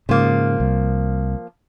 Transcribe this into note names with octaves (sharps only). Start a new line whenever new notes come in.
G#2 C#3 F3 A#3
C2